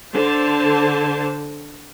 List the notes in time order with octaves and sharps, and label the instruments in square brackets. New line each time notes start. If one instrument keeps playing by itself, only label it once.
[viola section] D3 C5 A5